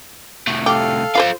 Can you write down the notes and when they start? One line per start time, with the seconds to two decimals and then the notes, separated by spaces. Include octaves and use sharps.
0.48 C2 A3
0.66 G4 A4 F5
1.15 F4 A4 B4 C5 F5